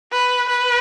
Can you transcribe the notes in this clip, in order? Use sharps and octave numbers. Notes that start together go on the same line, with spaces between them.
B4
B4